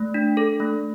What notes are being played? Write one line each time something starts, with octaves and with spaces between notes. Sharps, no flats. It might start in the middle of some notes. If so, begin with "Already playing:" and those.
Already playing: A3
D4
A4
A3